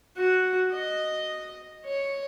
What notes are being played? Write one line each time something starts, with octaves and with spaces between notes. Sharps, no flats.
F#4
D#5
C#5